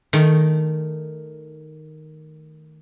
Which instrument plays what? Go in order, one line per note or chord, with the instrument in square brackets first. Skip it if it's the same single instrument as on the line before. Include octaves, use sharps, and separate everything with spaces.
[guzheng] D#3 A3